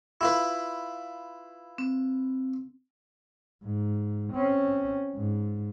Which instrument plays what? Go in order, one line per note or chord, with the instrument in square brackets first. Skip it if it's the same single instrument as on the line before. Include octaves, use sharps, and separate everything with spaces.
[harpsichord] E4 F4 B4
[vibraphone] C4
[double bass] G#2
C4 C#4
G#2